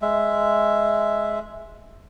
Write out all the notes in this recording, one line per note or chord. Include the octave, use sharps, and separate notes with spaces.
G#3 E5